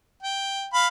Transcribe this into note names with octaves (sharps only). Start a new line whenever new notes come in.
G5
F5 B5